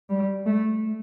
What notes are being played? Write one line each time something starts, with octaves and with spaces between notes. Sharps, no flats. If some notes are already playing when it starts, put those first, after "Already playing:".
G3
A3